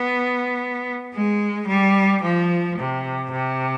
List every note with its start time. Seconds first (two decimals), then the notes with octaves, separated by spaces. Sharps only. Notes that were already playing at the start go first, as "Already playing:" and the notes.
Already playing: B3
1.14 G#3
1.68 G3
2.23 F3
2.79 C3
3.32 C3